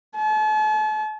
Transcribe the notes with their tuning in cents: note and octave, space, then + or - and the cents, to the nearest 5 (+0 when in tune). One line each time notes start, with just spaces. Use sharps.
A5 -40